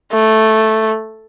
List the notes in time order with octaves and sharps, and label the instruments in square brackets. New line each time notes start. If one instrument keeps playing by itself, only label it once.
[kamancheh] A3